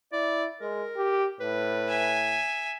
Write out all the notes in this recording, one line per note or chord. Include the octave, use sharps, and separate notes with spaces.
E4 D5
G#3 A#4
G4
A2 B4
E5 G#5